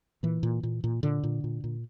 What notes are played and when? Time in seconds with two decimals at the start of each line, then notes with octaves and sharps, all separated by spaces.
0.23 A#2 E3
0.43 A#2
0.63 A#2
0.84 A#2
1.03 A#2 D3
1.23 A#2
1.44 A#2
1.64 A#2